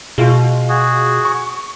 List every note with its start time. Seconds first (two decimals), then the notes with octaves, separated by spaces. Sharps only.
0.18 B2 G#3 F4
0.69 F#4 G#4
1.25 C#6